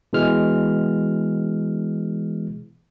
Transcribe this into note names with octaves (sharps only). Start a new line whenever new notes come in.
B2 E3 G#3 F6